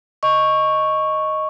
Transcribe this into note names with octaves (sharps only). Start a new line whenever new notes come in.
D#5 C#6